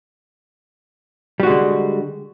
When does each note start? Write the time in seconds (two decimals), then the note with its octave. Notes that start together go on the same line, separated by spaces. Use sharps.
1.40 G3
1.43 F#4
1.47 G#3
1.50 D3